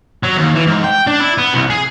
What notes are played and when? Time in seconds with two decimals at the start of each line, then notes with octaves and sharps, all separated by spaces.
0.24 F#3
0.37 D#2
0.56 E3
0.67 G#2
0.84 G5
1.07 D4
1.20 E4
1.38 B3
1.54 C2
1.70 G#4